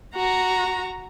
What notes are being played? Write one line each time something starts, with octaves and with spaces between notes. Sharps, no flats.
F#4 A#5